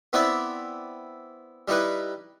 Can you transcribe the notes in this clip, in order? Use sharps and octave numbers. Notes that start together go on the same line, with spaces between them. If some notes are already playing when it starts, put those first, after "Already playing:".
B3 C4 E4 D5 E5
G3 D#4 E4 B4